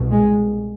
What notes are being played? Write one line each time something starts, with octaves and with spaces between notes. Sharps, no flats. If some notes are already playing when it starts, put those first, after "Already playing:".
Already playing: C2 B2
G#3